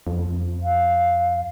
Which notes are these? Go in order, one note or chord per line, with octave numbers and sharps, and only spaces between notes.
F2
F5